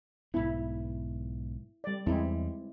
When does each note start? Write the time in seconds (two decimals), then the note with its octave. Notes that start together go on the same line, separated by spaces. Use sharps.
0.34 B1 G#2 B3 E4
1.84 G3 D5
2.06 E2 G3 G#3 C4 E4